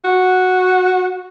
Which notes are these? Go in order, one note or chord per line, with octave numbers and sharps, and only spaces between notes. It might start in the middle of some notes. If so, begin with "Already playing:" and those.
F#4